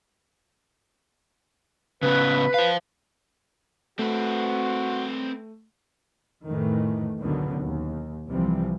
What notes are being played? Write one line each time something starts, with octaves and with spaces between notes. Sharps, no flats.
C#3 B3 B4
C5 F5
A3 C4 F#4 B4
F2 A2 D#3 E3 A3
C#2 F#2 B2 D3 D#3 B3
D#2
C2 C3 E3 F3 G3 C4